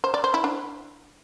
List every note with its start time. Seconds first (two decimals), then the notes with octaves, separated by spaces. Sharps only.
0.04 C5
0.14 D5
0.24 C5
0.34 E4
0.44 D4